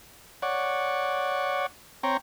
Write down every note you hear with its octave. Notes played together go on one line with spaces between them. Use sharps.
C#5 D5 F#5
C4 C#5 G5 A#5